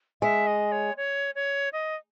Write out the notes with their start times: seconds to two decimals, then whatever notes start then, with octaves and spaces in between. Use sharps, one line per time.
0.22 G#3 E5
0.47 D#5
0.72 C#5
0.97 C#5
1.35 C#5
1.73 D#5